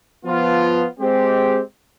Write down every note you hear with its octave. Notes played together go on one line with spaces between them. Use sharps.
F3 B3 F4
G#3 C4 G4